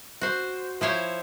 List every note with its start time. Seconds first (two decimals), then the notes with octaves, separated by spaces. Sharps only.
0.21 F#4 C5
0.81 F3 E4 C5 C#5